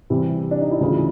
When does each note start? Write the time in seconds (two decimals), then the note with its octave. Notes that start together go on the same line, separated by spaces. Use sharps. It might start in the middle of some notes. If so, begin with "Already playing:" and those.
0.10 C3 E3 G3
0.51 D4
0.61 D#4
0.71 E4
0.81 D2 C#3 E3 F4
0.92 E4